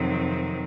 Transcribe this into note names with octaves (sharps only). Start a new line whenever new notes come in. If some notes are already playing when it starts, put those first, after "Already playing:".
Already playing: F2 C3 D#3 F#3 C4